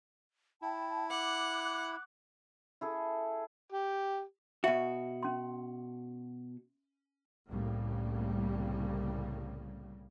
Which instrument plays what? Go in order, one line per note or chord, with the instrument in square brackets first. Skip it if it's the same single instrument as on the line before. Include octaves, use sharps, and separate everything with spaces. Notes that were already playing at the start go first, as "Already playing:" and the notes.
[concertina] E4 [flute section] G5 A5 B5
[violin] F#5 [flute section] D6 F#6
[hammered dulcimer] E4 G#4 A4
[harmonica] G4
[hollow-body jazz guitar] B2 F#4 [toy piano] E5
[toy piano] C#4 C6
[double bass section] C2 A2 C#3 G3 A#3